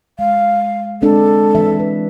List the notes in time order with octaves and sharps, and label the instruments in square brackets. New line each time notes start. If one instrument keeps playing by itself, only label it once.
[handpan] G#3 [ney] F5
[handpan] G#3 C4 D4 [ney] A4
[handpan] E3 E5
B4